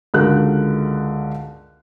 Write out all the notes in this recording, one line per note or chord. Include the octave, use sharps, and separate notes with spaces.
C#2 D3 F#4 A#4 F#6